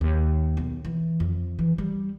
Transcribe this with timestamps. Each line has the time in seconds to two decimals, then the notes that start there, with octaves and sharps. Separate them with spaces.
0.01 D#2
0.57 B1
0.85 E3
1.20 F2
1.59 E3
1.78 G3